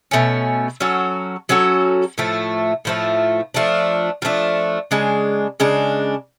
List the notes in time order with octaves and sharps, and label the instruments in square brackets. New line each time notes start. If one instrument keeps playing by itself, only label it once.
[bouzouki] B2 A3 C#4
F#3 C#4 F#4 A4
F#3 C#4 F#4 A4
A2 F3 A3
A2 F3 A3
F3 A3 D4
F3 A3 D4
C#3 G#3 D4
C#3 G#3 D4